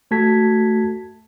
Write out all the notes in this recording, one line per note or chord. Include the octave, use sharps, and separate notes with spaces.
A3 F#4 A4 A5 G#6 B6